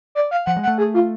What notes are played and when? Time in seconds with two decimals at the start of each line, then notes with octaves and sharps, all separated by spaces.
0.15 D5
0.31 F5
0.46 F3 F#5
0.57 G#3
0.63 F#5
0.67 A3
0.78 G#4
0.94 F4